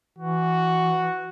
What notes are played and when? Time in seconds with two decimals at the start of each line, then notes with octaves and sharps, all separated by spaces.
0.18 E3 F#4